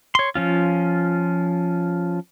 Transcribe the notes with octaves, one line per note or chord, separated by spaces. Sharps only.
C#5 C6
F3 C#4 F4